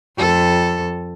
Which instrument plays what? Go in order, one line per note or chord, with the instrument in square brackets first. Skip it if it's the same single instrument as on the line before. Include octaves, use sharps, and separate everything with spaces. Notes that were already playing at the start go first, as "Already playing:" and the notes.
[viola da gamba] F2 A4